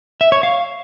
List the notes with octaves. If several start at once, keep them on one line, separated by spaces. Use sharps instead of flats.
E5
C#5
F5